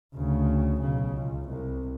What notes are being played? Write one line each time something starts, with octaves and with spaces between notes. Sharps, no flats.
D2 C#3
B1 C#3
C#2
C2